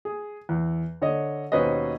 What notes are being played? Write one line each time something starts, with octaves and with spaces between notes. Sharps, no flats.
G#4
E2
D3 C#5 D#5
D#2 B2 C#4 B4 C5 D#5